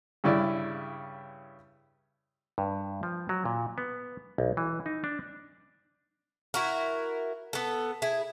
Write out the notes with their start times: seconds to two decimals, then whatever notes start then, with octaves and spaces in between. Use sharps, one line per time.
0.24 G2 C#3 E4 D5
2.58 G2
3.03 F3
3.29 F#3
3.45 A#2
3.78 B3
4.38 B1
4.57 E3
4.86 D#4
5.04 D4
6.54 E4 F#4 A#4
7.53 B3 A4
8.02 E4 G#4